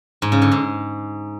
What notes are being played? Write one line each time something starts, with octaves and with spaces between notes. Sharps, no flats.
G#2
C#3
D3
G#2